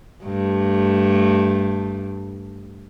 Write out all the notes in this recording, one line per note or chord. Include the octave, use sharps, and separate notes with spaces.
G2 A3